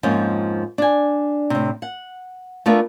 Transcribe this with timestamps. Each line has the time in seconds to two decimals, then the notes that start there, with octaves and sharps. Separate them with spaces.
0.03 F2 G#2 F3 A#3 C#4
0.78 D4 G#5
1.50 A2 C3
1.82 F#5
2.66 A3 B3 D4 F4 A#4 E5